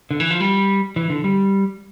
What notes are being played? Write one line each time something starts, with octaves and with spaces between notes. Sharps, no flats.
D3
E3
F3
G3
E3
D3
G3